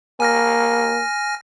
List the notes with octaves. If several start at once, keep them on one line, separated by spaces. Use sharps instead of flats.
A#3 G#5 F6 A#6